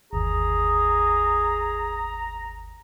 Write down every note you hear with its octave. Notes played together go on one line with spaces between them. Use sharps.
G1 D#2 G#4 A#5